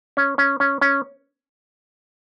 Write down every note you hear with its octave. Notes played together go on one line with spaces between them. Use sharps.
C#4
C#4
C#4
C#4